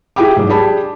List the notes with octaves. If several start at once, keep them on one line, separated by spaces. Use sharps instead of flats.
E4 G4 G#4 G5 B5 D6
G#2 F#3
D4 G4 G#4 A5 B5